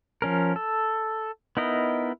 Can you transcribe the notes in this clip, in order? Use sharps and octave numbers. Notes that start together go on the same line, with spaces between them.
F3 C#4 A#4
A4
B3 D#4 E4 A#4 D#5